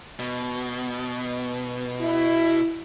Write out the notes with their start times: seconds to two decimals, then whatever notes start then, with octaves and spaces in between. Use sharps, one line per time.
0.19 B2
2.01 E4